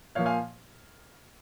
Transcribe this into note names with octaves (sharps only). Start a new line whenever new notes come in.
A#2 F3 A#3 C#5 F5
F5 G#5